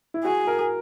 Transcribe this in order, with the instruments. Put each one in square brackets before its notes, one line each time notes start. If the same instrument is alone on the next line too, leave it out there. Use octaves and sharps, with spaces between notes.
[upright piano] E4
[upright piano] F#4 [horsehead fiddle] G#4
[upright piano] A#4